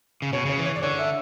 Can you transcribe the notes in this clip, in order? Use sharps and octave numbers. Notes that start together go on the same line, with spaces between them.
C#3
B2 C#5
C#3 C#5
E3
C#5
D5
D3 C#5
E5